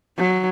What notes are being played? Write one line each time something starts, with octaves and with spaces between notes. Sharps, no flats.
F#3